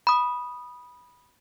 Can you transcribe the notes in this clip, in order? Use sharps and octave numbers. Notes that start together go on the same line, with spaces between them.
B5 D#6